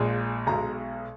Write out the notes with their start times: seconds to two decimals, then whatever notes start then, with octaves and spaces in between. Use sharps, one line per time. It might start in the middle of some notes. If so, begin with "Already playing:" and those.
Already playing: A#1 A#2 G#3
0.47 B1 B2 G#3 A#5